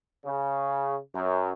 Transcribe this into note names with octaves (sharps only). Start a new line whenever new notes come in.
C#3
F#2